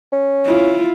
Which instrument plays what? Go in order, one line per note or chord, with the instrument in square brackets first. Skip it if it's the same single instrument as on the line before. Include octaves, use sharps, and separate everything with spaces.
[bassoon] C#4
[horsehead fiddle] E4 F4